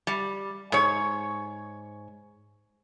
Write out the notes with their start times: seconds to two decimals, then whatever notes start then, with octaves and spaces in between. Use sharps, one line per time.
0.07 G3
0.72 G#2 C#5